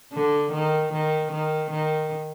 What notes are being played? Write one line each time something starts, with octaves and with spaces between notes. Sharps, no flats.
D3
D#3
D#3
D#3
D#3